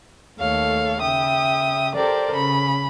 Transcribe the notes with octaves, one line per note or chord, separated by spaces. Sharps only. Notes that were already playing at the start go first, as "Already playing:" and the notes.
D#2 A3 A4 C#5 F5
C#3 E5 G5 D#6
G4 A4 A#4 C5 D5
C#3 B5